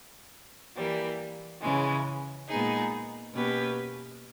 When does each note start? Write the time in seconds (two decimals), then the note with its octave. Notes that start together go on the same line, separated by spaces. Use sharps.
0.76 E3 G3 A#3
1.62 C#3 E3 G#3 C#4
2.48 A#2 G#3 B3 D#4 G#4
3.34 B2 A#3 C#4 G4 B4